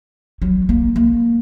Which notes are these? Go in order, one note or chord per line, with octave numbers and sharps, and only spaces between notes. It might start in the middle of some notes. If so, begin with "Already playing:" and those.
F#3
A#3
A#3